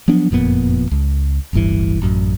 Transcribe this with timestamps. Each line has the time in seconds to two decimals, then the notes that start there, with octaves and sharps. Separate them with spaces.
0.08 F3 F#3 B3 D4
0.31 F#1 F2 A#2 B3
0.91 C#2
1.53 D1 G1 G2 E3
2.02 A1 F#2